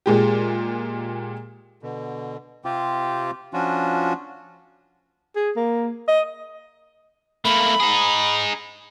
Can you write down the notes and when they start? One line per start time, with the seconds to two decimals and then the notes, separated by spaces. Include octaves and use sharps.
0.06 A#2 G#3 G4
1.83 B2 D3
2.65 C3 C4 F4 G4
3.53 F3 C#4 D4 F4 F#4
5.36 G#4
5.56 A#3
6.08 D#5
7.45 A3 A#3 B5
7.80 D#4 G#4